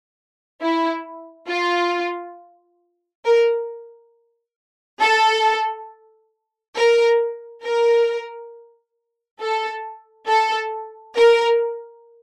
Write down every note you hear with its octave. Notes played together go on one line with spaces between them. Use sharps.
E4
F4
A#4
A4
A#4
A#4
A4
A4
A#4